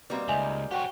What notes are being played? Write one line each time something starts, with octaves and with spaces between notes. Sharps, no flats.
B2 G3 A#3 C4 B4 D#5
C#2 D#4 B4 E5 G#5
C#4 F#4 G4 C5 G5 C#6